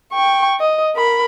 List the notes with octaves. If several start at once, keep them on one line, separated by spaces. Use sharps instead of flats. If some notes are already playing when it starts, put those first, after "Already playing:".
G5 C#6
D#5
A#4 B5